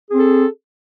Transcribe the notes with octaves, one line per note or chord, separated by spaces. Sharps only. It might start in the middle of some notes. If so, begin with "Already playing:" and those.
C4 G#4 A4